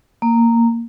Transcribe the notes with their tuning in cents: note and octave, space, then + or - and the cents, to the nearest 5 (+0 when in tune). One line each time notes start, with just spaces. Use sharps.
A#3 -10